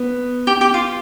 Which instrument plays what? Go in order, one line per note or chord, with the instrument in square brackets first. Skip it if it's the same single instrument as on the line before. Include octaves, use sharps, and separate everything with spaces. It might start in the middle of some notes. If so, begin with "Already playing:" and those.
Already playing: [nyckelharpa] B3
[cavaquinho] G4
G4
F4